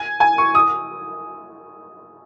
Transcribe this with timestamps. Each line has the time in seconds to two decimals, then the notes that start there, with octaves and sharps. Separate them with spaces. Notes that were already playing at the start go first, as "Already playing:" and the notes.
Already playing: G#5
0.20 G#5
0.38 C#6
0.55 D#6